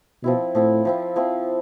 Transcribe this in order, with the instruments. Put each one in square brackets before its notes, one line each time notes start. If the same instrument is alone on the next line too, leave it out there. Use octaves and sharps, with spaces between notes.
[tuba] B2 [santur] F3 C4 E4
[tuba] A2 [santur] F3 C4 E4
[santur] F3 C4 E4
F3 C4 E4